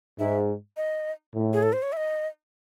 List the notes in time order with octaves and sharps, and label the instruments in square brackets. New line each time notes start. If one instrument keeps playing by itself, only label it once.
[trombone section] G#2 [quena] E5
[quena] D#5
[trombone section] A2
[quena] G#4
A4
C5
C#5
E5
D#5